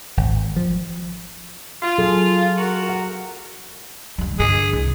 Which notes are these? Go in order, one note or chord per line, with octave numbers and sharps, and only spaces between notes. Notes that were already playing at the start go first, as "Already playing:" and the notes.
G#1
F3
F4
F#3 G#4 A4
F#4 A#4
F#5
D3 G3
G2 D3 G#4
C2